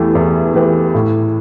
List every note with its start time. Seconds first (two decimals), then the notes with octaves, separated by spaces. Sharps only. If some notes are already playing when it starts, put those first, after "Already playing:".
Already playing: E2 E3 A3 G4 B4
0.15 E2
0.55 E3 A3 G4 B4
0.94 A2